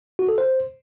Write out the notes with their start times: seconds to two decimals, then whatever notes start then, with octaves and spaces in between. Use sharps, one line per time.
0.19 F#4
0.29 A4
0.38 C5